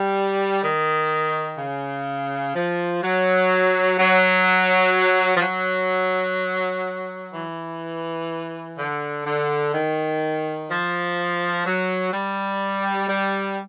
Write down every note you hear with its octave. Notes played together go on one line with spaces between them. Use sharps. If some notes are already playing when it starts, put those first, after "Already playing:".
Already playing: G3
D#3
C#3
F3
F#3
F#3
F3
F#3
E3
D3
D3
D#3
F3
F#3
G3
G3